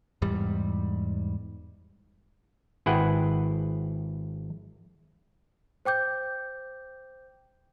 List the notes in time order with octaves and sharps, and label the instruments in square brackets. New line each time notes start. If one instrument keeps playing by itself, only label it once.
[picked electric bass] E2 G#2 G3
[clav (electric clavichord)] G#1 E4 G#4 B4 F#5 G5
[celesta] C5 G5 D6 G6